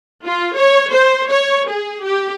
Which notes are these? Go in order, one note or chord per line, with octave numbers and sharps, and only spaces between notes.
F4
C#5
C5
C#5
G#4
G4